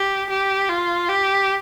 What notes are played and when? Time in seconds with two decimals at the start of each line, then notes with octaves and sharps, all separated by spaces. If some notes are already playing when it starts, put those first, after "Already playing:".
Already playing: G4
0.30 G4
0.69 F4
1.09 G4